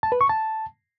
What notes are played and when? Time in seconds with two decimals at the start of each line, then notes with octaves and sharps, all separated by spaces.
0.03 A5
0.12 B4
0.21 C#6
0.29 A5